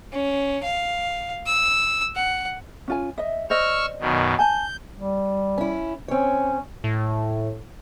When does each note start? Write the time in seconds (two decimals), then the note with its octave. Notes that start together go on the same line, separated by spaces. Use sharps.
0.13 C#4
0.63 F5
1.47 E6
2.15 F#5
2.88 C#4 F4 G#5
3.18 D#5 E5
3.50 C5 D5 D#5 C#6 E6 F6
4.00 F#2 B2 D#3
4.39 G#5 A5 G6
4.97 G3
5.58 C#4 E4
6.08 C4 C#4 C#5
6.84 A2